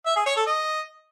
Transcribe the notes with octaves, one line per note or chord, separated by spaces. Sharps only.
E5
G#4
C#5
A4
D#5